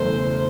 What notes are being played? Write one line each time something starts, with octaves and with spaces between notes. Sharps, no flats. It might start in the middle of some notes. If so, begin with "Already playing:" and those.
Already playing: F#1 E2 B2 A3 C5